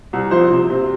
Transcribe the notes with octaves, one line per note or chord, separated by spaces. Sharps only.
C2
F3 C5
C3
C3